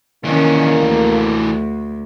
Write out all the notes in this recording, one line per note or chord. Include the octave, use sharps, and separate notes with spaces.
D#3 E3 A#3 C#4 D4
D2